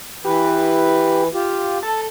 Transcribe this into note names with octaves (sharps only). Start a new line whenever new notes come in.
E3 G4 B4
F4 G4
A4 A5